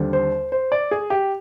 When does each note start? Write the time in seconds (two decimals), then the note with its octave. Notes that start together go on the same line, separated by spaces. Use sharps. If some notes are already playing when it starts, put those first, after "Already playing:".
Already playing: D#2 D3 G3 C4
0.13 C5
0.52 C5
0.72 D5
0.91 G#4
1.10 G4